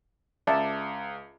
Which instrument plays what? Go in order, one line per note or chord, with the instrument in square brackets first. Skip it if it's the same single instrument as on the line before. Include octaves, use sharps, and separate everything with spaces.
[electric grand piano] C#2 [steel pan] D5 E5 A5